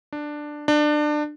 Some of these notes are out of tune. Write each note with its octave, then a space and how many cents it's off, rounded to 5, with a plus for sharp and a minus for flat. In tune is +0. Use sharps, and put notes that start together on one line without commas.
D4 +10
D4 +25